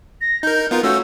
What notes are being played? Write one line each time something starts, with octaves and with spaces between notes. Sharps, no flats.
A#6
D#4 A#4 G6
B3 F4 A#4
A3 C#4 F#4 E6